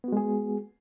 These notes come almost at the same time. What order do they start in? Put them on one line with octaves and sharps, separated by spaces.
B3 F#4 G#3 G#4